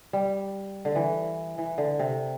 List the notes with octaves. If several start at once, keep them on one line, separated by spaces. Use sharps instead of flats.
G3
D3
E3
E3
D3
C3